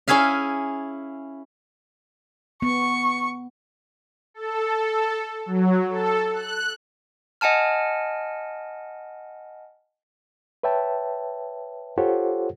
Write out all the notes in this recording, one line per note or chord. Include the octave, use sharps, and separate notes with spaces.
C#4 E4 G#4 E5 F5
B3 C#6
A4
F#3
A4
F#6
D#5 F#5 G#5 A5 F6
B4 C#5 E5 G5 A5
F4 G4 A4 C5 C#5 F#5